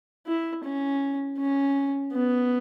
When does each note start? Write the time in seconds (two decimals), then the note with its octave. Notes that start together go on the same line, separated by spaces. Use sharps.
0.27 E4
0.64 C#4
1.38 C#4
2.12 B3